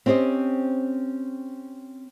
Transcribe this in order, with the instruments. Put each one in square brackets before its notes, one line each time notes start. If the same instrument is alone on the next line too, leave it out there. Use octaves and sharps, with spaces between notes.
[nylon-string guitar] C4 C#4 G4 C5 D#5